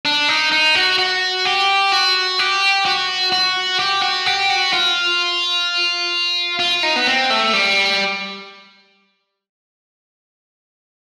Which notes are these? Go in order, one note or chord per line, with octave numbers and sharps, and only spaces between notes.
D4
D#4
D#4
F#4
F#4
G4
F#4
G4
F#4
F#4
G4
F#4
G4
F#4
F4
F4
D#4
B3
C4
A3
G3